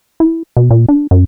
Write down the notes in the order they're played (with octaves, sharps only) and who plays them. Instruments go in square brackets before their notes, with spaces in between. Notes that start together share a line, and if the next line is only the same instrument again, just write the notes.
[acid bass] E4
B2
A#2
D4
F#2